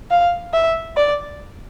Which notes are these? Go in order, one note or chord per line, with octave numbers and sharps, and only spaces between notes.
F5
E5
D5